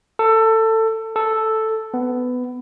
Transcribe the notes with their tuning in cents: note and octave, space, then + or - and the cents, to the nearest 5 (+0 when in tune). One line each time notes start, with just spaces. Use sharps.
A4 +20
A4 +0
B3 +15